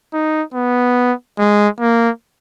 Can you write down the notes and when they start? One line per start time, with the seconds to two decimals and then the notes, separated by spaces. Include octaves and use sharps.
0.13 D#4
0.54 B3
1.39 G#3
1.80 A#3